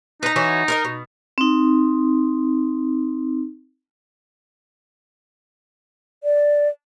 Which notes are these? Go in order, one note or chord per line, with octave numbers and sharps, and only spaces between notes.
D#4 B4 A#5
E3 F#4 C#5
A#4 B4 D#5
B2
C4 D#4
D5